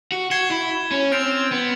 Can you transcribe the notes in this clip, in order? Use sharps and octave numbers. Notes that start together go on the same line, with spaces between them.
F#4
F#4 G#6 C7 E7 G7
E4
C#4
C4 F6 A6 D7 F7
B3